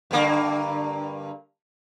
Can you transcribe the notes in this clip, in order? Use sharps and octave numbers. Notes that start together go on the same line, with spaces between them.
G2 D3 A#3